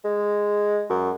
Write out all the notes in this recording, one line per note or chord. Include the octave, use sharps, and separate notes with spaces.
G#3
F#2